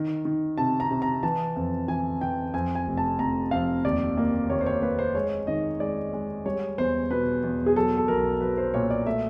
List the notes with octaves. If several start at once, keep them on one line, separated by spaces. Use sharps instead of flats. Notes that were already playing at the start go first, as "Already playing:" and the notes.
Already playing: D#3
D#3
C3 A5
A#5
C3
A#5
E3 A5
F2
E3 G#5
E3 G5
F2 G#5
G#5
F1
A5
F1 A#5
F2 F5
D#2 D5
A#3
D#2 C#5
C5
C#5
A#3 B4
C5
G#3 C#5
D#3 D#5
G#3 D5
G#3
G3 C#5
E2 C5
B2 B4
E2
G#4
F#3 A4
A4
B1 A#4
F#3 B4
C5
A#2 C#5
D5
A3 E5